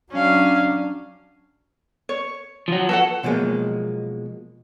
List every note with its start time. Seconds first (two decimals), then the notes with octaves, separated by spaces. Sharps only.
0.12 F#3 C#4 D4 F5
2.09 C#5
2.68 F3 F#3
2.89 A4 B4 C#5 F#5
3.23 B2 F3 F#3 G#3 A#3